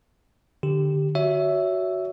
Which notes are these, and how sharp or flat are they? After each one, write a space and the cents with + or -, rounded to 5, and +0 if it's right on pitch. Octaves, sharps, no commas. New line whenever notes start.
D3 +10 G4 +0
F#4 +0 C#5 +25 E5 +0